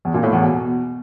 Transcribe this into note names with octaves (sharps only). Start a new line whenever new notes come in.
E2
A#2
A2
E2
B2